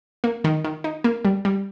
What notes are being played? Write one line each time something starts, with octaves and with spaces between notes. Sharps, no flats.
A#3
D#3
D#3
D#4
A#3
G3
G3